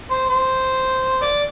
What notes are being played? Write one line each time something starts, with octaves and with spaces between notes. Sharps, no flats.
C5
C5
D5